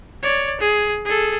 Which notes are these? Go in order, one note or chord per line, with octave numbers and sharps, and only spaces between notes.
C#5 D5
G#4
G#4 A4